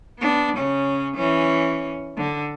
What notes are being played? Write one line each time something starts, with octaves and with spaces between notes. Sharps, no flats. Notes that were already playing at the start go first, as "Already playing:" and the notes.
B3 D4
C#3 C#4
E3 C#4
D3